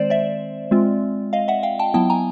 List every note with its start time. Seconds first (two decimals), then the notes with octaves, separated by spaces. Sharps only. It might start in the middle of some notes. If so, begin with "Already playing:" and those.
Already playing: D#3 G#3 C4 C5 D5
0.10 D5 E5
0.71 G#3 C4 F4
1.33 D#5 F5
1.48 E5 F#5
1.63 F5 G5
1.79 G5 A5
1.94 F#3 B3 E4 G5 A5
2.10 G#5 A#5